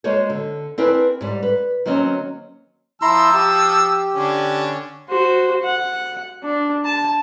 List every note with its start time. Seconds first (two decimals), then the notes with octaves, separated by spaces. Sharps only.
0.04 G#3 A#3 F#4 C5 C#5
0.30 D3
0.78 C4 D4 E4 G#4 A#4 B4
1.21 G#2 G3
1.43 B4
1.86 D#3 F#3 A#3 C4 C#4
3.02 F3 E4 A5 A#5 C6 E6
3.34 G4
4.15 D3 C#4 D4
5.08 F#4 C5
5.63 F#5
6.43 D4
6.85 A5